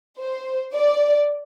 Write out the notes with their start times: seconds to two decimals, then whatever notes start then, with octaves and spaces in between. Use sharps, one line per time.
0.19 C5
0.74 D5